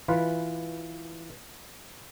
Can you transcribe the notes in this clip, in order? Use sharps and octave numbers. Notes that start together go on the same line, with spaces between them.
E3 F4 B4